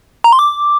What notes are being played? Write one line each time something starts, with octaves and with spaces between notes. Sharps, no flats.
A#5
C6
D6